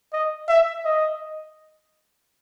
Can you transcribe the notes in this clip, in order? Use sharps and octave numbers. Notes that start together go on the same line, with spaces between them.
D#5
E5
D#5